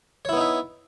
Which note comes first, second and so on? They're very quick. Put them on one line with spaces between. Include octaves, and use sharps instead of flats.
C#5 E4 B3 D#4 E5